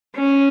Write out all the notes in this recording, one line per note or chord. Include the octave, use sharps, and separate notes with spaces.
C#4